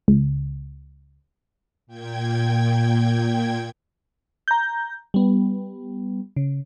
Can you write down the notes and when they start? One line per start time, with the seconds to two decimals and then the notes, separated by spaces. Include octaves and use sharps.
0.08 C#2
1.87 A#2 G5 G#6
4.48 A#5 G6
5.14 G3 B3
6.36 C#3